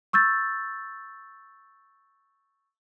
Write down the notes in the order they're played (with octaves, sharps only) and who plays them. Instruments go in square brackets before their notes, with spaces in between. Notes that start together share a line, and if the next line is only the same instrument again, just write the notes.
[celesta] C#6 E6 G6 A6